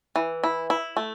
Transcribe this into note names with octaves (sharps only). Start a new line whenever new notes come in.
E3
E4
E4
A3